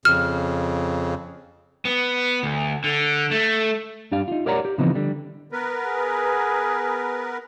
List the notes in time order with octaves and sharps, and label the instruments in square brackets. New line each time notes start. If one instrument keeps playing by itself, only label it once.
[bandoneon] F2 C#3 [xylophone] F6
[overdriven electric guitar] B3
D2
D3
A3
[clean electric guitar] G2 D4 G4 F5
D#4 F4
G4 A#4 C#5 D5 F#5 A#5
G4
C#3 E3 F3 B3 C4 D#4
D3 G3
[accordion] B3 A#4 B4
[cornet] G#4